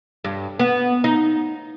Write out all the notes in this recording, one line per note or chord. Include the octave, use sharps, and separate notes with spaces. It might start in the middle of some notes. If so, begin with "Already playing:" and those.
G2
B3
D#4